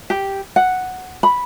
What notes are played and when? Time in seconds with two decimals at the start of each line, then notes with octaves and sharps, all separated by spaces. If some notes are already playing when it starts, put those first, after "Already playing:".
0.10 G4
0.56 F#5
1.23 B5